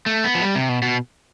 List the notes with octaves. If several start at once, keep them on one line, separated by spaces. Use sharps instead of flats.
A3
B3
F3
G3
C3
B2
B2